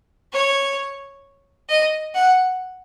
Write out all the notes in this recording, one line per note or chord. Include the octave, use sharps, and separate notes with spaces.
C#5
D#5
F#5